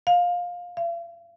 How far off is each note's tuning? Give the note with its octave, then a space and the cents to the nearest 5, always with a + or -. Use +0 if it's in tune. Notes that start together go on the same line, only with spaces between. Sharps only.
F5 +15
F5 -45